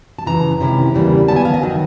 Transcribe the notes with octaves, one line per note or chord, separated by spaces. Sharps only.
A5
F#2 C#3 E3 A#5
C3 D#3 G#3 C#4 E4
E2 C#3 E3 G3 A#3
D#3 F#3 B3 A5
G#5
F5
D#5
D#3 F#3